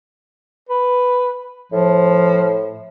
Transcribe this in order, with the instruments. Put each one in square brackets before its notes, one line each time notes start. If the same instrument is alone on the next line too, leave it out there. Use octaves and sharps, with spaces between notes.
[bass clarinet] B4
[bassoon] A2 [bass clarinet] F3